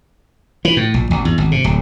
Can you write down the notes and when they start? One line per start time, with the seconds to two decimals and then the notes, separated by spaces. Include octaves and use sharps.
0.65 E3
0.77 A2
0.94 A#1
1.11 G#1
1.25 E2
1.38 G#1
1.52 C3
1.64 D1